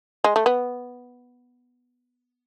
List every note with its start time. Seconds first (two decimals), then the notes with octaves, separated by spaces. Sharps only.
0.24 G#3
0.36 A3
0.46 B3